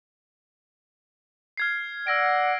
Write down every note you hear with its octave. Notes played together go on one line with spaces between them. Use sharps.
F6 G#6 C7
D5 F#5 E6 A#6 D7